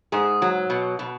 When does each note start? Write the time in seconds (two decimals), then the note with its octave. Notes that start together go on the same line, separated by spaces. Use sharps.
0.12 G#2 G#4
0.42 F#3
0.70 B2
0.99 B2